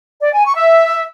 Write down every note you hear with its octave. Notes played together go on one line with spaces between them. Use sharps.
D5
G#5
C#6
E5